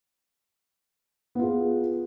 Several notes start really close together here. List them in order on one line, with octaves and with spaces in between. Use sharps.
B3 F4 G#4